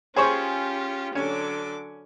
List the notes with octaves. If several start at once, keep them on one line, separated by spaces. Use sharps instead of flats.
C#4 F4 G4 G#4 C5 C#5
D3 F#3 C#4 D6